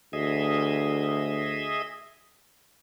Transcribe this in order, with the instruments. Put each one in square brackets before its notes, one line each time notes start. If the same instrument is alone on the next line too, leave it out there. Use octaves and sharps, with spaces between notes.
[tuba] D2 [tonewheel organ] G#4 D#5 E5